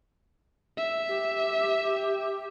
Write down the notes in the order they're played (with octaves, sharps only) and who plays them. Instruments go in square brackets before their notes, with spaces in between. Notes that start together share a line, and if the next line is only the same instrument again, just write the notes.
[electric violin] E5
[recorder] G4